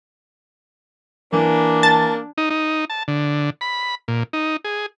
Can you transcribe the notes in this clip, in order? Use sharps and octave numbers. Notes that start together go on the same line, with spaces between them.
E3 A#3 D4
A5 A6
D#4
D#4
A5
D3
B5
A#2
D#4
G#4